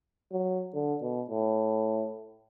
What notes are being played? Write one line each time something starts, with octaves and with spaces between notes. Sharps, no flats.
F#3
D3
B2
A2